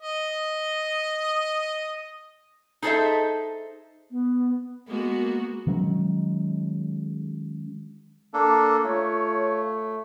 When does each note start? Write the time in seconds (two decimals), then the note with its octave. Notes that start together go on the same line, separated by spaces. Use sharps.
0.02 D#5 D#6
2.82 D#4 G#4 A4 C5 D#5 E5
4.11 B3
4.87 G#3 A#3 B3 F#4
5.67 D#3 F#3 G#3 C#4
8.34 A#3 D4 A4
8.84 A3 F4 C#5